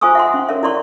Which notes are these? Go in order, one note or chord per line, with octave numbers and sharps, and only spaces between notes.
F4 C5 G#5 C#6 D#6 E6
E5 F#5 C6
C#4
A#4 C#5 E5
E4 D5 C6 C#6